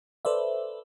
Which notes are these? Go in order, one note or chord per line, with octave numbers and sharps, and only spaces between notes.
A4 B4 C5 D5 E5